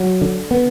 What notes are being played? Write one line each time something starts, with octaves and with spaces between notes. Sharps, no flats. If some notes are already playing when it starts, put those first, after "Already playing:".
Already playing: F#3
D3
B3